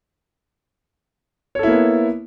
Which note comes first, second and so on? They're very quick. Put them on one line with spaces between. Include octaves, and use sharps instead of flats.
C#5 A4 E4 A#3 B3